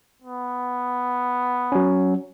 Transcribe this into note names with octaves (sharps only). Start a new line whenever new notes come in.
B3
F#3 C#4